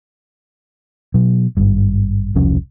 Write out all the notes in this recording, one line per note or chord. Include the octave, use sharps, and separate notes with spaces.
B2 F#3
G#1 G2
E1 C2 F3 C#4